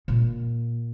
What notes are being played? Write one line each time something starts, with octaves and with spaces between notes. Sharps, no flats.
A#2